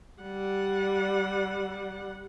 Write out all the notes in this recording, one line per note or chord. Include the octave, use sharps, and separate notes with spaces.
G3 F#5